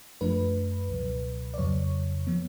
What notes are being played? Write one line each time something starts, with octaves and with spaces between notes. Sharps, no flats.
F#2 F3 A3 D4 B4
C#2 B2 F#3
D5
F2 C#3 F#3 C#5
F3 B3